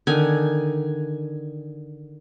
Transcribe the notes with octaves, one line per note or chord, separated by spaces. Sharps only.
D3 D#3 G#5